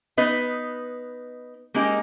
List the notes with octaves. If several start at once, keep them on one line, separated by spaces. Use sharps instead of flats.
B3 D#4 B4 D#5
G#3 A#3 C#4 D#4 G4